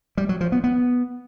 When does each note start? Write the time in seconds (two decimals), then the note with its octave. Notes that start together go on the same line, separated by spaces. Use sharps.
0.17 G3
0.29 F#3
0.41 F3
0.52 B3
0.64 B3